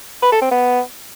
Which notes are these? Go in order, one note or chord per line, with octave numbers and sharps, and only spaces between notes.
B4
A4
C4
B3